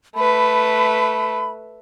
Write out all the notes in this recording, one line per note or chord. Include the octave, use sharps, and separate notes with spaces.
A3 B4 B5